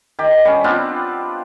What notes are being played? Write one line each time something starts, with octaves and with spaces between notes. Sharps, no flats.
D#3 G4
G3 C#4
B3 C4 D4 F4